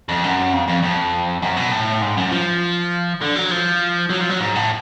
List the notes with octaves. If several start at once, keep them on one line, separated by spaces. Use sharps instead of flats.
F2
F#2
F2
F2
F2
F#2
B2
A2
G#2
F#2
F3
D3
F#3
F3
F#3
F3
F#3
G#2
A2